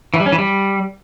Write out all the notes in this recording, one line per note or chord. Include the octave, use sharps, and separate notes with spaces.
E3
G3
C#4
E3
G3